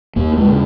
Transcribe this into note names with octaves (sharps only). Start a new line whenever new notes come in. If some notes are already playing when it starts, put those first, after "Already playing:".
D#2 A#3
G#3
C#3